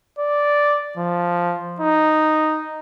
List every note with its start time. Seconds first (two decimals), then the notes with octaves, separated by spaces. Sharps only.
0.19 D5
0.97 F3
1.80 D#4